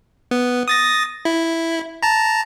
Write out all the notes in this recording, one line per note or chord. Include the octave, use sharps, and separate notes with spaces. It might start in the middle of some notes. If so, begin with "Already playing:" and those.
B3
D#6 A6 A#6
E4
A5 A#5